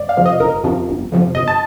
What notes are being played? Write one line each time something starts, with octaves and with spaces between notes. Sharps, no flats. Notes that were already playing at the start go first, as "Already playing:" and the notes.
Already playing: G1 D5
F5
F2 C3 F3
D#5
G1 A#4
F2 C3 F3
G1
F2 C3 F3
G1 D#5
A5